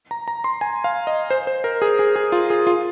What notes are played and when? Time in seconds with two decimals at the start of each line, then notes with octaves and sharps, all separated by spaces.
0.11 A#5
0.28 A#5
0.44 C6
0.61 G#5
0.84 F5
1.07 D#5
1.30 C5
1.47 C5
1.64 A#4
1.82 G#4
1.99 G#4
2.16 G#4
2.32 F4
2.50 G#4
2.67 F4